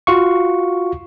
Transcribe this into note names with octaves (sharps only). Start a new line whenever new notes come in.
F4 F#4 F5 C#6